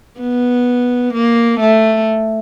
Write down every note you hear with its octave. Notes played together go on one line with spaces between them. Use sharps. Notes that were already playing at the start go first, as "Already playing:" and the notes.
B3
A#3
A3